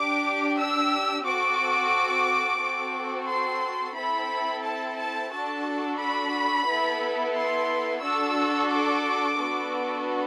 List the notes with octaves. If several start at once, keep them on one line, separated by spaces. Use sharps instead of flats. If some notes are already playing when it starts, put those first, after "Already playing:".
Already playing: D4 G4 D6
E6
C4 F#4 A4 D6
C4 F#4 A4
C6
C4 E4 A4 B5
A5
A5
D4 F#4 A4 A5
B5
B3 E4 A4
C6
D4 F#4 A4 E6
D6
B3 D4 F#4 A4